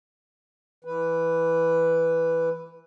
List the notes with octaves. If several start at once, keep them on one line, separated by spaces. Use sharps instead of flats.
E3 B4